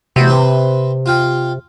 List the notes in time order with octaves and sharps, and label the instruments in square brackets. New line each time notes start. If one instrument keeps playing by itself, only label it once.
[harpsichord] A1 B3 F#4 [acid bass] C3
[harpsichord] C4 B4 C6
F4 F5 G5